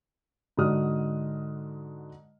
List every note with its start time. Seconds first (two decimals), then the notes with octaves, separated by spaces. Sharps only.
0.57 G#2 D3 F#4 D#6 F6